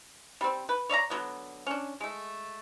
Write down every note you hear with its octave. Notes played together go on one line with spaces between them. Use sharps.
G3 C4
B4
C#5 D5 E5 A#5
D3 F#3 B3
C#4 D4
G#3 A3